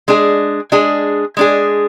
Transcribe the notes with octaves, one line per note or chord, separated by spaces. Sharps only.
G#3 D4 G#4
G#3 D4 G#4
G#3 D4 G#4